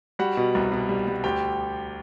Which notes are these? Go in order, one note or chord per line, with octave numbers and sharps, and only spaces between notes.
G3 F#4 F#5
B2
C2
B2
G3
G3
D2 G4 G5